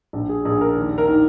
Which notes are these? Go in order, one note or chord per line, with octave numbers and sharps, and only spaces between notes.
A#1
G#4
A#1 G#4
A#4
D#2
A#4
D#3